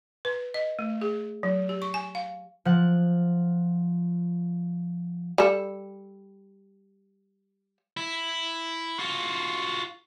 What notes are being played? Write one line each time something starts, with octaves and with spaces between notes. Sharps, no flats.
B4
D#5
A3
G#4
F#3
G4
C#6
G#5
F5
F3 F#5
G3 A4
E4
F4 F#4